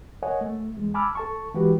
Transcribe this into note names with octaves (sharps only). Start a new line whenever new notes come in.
A#4 C#5 D#5 F#5 G#5
A3
E2 G#3
G#5 A5 B5 D6 E6 F6
A4 A5 C#6
E3 G#3 F#4 G4 B4